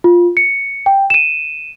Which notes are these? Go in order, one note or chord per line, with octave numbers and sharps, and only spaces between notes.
F4
C#7
G5
D#7 E7